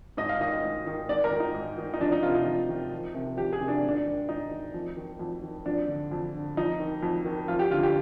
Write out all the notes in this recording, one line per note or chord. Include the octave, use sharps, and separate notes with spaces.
G#2 D#5
F5
D#3 D#5
G#2
D#3
G#2 D5
A#4
D#3
D#4
G#2
D#3
D#4
F2 D4
D#4
C3 D#3 F4
D#4
F2
C3 D#3
F2
C3 D#3
F2 G4
G#4
C3 D#3
D4
G#2
D4
D#3
G#2 D#4
D#3
F2
D#3
F2
D#3
F2 D4
D3
F2
D3
F2 D#4
D#3
F2
D#3
F2 F4
G4
D3 F4
G4